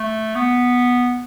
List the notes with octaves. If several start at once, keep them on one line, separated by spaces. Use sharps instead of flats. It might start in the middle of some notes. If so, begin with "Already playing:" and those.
Already playing: A3
B3